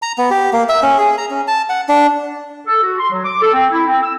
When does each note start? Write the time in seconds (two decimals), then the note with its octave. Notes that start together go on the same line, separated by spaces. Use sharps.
0.02 A#5
0.18 B3
0.31 G4
0.53 A#3
0.69 E5
0.83 C#4
0.98 G#4
1.18 A#5
1.30 C#4
1.47 A5
1.69 F#5
1.89 D4
2.66 A4
2.82 F#4
2.99 C6
3.11 F#3
3.25 D6
3.41 A4
3.53 C4
3.71 E4
3.87 C4
4.02 E6